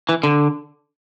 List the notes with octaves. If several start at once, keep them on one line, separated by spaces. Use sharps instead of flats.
E3
D3